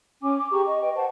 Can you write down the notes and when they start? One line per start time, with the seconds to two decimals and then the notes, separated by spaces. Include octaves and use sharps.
0.21 C#4 G#5 D6
0.37 D6
0.51 G4 G#4 A#5 C#6
0.66 D#5 C#6
0.81 B4 D#5 G5
0.95 C5 F#5 A5